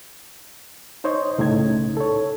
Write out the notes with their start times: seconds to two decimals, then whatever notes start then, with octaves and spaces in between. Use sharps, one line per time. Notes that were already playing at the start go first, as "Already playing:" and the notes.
1.04 D#4 C5 C#5 D#5
1.38 C2 A2 C#3 D#4 G#6
1.97 A4 C#5